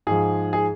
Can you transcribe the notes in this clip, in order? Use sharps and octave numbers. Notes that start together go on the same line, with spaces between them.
G#2 F3 G#4
G#4